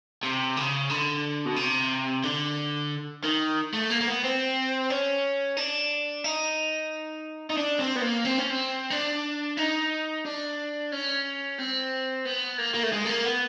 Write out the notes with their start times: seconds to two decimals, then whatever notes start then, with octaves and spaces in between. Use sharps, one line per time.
0.23 C3
0.56 C#3
0.90 D3
1.46 B2
1.56 C3
2.24 D3
3.24 D#3
3.73 A3
3.90 A#3
4.01 A#3
4.07 B3
4.24 C4
4.90 C#4
5.57 D4
6.24 D#4
7.50 D#4
7.57 D4
7.80 C4
7.96 B3
8.02 A#3
8.25 C4
8.38 C#4
8.50 C4
8.91 D4
9.57 D#4
10.25 D4
10.92 C#4
11.58 C4
12.25 B3
12.58 A#3
12.74 A#3
12.83 A3
12.92 G#3
13.05 A3
13.09 A#3
13.25 B3